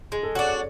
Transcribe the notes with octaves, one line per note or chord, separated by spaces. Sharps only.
G#3 G#4
A4
D4 F#4 C#5
D5